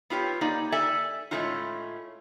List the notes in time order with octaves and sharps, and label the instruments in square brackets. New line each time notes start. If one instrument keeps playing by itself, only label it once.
[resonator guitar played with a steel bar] B3 F4 G4 C#5
A#3 D#4 G4 D5
A4 D5 E5 G#5
A2 G#3 A3 C#4 D#4 F4